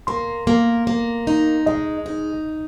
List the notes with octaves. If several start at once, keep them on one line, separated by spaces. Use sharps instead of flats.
A#3 C6
A#3
A#3
D#4
G#3 D#5
D#4